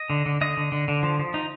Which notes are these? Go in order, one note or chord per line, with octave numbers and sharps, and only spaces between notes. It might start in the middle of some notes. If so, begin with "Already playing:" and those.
Already playing: D#5
D3
D3
D3 D#5
D3
D3
D3
F3
F3
D#4